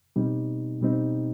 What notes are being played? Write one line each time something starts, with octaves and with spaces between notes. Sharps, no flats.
B2 G3 C4 D#4
B2 G3 C4 D#4